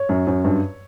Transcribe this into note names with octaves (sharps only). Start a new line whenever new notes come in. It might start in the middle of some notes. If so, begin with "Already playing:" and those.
Already playing: C#5
F#2
F#2
G2